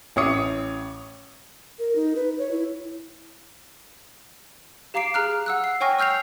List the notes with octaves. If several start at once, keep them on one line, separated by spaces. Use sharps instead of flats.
A1 E4 C#5 D6 D#6 C#7
A#4
D#4
B4
C#5
E4
G4 F5 A#5 D6 C7 D7
G#4 A#5 F6 F#6
F#5 E6 F#6
C7
C#5 G5 G#5 C#6 F6 A#6
E6 F6 G6 C7 F7